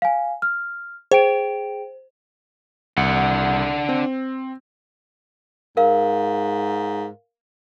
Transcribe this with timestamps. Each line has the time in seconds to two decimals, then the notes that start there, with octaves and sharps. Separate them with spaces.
0.02 F5 G#5
0.42 F6
1.12 G#4 C5 G5 D7
2.97 C2 D4 F#5
3.89 C4
5.77 G#2 A#4 F5